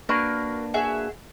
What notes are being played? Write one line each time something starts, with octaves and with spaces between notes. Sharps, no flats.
A#3 D4 F#4 A#4 B4
F#4 G#4 E5